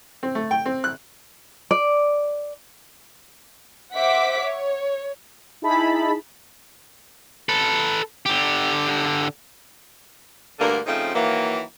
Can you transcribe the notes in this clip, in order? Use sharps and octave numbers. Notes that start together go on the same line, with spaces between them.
C4
A3
G5
C4
F#6
D5
C5 E5 F#5 D6 B6
C#5
D#4 E4 G#4 A5 B5
A4 B4
D3 G4
D2 G2 D3 A#3 A#4
C#3 F3 A3 C4 D#4
D#3 E3 F#3 A#3